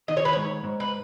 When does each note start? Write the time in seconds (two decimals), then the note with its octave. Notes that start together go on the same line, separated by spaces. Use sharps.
0.08 D#3 D#5
0.17 C#5
0.25 B4
0.33 G#2 C#5
0.64 G#2
0.80 B4